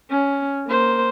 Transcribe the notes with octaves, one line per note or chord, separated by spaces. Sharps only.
C#4
A#3 C5